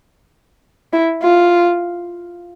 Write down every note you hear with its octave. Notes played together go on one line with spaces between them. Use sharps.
E4
F4